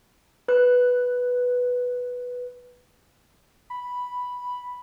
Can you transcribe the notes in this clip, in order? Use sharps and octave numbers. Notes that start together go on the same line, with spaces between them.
B4 F#6
B5